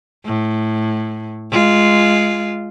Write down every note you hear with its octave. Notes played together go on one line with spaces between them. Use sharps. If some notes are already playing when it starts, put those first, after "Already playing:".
A2
G#3 F4